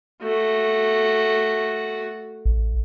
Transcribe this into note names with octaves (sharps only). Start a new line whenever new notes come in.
A3 F#4
A1